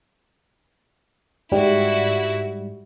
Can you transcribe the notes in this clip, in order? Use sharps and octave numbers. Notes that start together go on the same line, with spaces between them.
G#2 G3 E4 F#4